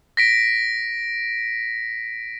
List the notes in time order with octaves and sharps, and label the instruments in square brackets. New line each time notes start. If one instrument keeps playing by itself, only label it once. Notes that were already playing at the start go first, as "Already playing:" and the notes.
[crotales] A#6 B6 D7